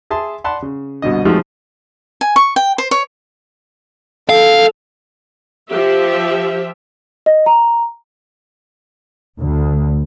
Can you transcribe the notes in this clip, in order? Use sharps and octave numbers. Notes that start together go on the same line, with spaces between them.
G#4 E5 A5 C6
D5 F#5 A5 B5 C6
C#3
C2 B2 D3 D#5
C3 F3 G#3 A3 D#4 F#4
G#5
C#6
G5
C5
C#5
A4 F5
F3 G4 E5
D#5
A#5
D2